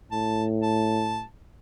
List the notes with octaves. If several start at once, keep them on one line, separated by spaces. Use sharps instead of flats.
A2 A5
A5